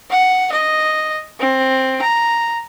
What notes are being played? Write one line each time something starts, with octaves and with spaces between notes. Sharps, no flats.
F#5
D#5
C4
A#5